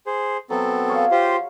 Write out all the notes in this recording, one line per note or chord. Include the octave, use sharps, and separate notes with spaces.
G#4 C5
F#3 B3 C4 A4
G#4 C#5 F5
F4 G4 C5